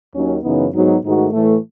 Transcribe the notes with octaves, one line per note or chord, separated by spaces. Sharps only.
D#2 D#3 F#3 C#4
F#2 C#3 E3 B3 D#4
G#2 F#3 B3 D#4 F#4
G#2 D#3 A3 D#4 F#4
A2 E3 A3